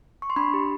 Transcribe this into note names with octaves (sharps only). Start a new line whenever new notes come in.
C#6
C6
D4 B5
G4